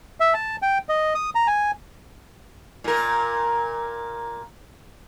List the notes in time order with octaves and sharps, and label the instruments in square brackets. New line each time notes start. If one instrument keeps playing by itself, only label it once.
[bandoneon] E5
A5
G5
D#5
D#6
A#5
G#5
[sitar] A#2 A#4